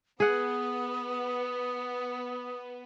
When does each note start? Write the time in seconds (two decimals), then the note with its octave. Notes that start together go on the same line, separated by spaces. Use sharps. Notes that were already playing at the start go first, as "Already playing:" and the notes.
0.20 B3 G#4 F#5 D#6